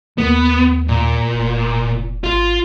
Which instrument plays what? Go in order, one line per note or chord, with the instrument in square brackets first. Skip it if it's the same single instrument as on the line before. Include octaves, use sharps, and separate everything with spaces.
[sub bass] D#2 [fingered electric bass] A#3 [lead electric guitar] B3
[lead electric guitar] A#2
[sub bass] F1
[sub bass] G#1 [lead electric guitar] F4